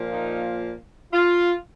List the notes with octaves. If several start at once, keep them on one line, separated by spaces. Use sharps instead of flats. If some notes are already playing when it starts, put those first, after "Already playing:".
Already playing: A#2 F3 A#3
D#4
F4